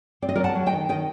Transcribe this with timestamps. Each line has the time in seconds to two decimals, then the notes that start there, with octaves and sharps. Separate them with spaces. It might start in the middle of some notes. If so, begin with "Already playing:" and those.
0.22 C4 D5
0.29 D#5
0.36 F#3 A#4 D5
0.44 F#5 A5
0.55 F#3
0.66 D#5 G5
0.73 D#3
0.89 D#3 D#5 G5